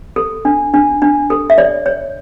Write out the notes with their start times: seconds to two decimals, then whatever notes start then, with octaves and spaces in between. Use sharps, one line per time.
0.16 A4
0.45 D4
0.74 D4
1.02 D4
1.30 A4
1.50 E5
1.58 C#5 D5
1.86 C#5